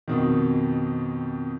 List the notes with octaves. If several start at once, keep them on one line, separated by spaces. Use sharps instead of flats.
F2 B2 D#3